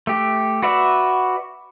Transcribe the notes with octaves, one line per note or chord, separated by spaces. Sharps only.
A3 G4
F#4 B4 D5 E5